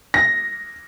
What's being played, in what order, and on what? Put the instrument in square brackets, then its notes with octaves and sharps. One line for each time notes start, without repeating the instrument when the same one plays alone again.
[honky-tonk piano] A#6